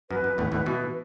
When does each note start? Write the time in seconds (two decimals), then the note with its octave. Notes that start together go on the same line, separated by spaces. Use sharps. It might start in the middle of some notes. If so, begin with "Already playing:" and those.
0.10 F#2 B4
0.24 F#2
0.38 E2 A2
0.52 E2 A2
0.66 B2 E3